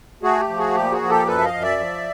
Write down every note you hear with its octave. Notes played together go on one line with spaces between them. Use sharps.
A3 F#4 G#4
G4
F3
F#4 G#4
A#2 G4
F#4 G#4
F3
G4 A4
F#2 A4 B4
E5
D#5 F5
F#2
D5 E5
F3